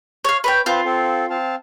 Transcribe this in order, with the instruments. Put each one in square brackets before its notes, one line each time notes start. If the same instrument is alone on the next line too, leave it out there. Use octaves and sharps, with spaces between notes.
[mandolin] C#5 F5
B4 C#5 G5
[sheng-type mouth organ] C4 B4 A5 [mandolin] F4
[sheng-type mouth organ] C4 A4
C4 F5 A5